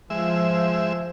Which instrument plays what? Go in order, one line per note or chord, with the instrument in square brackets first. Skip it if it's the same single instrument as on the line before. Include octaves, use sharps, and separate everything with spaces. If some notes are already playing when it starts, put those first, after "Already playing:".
[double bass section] F3 [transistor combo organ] G#3 E5